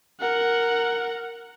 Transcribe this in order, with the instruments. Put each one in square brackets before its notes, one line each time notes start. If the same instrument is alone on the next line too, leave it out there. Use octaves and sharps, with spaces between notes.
[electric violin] A#4 F#5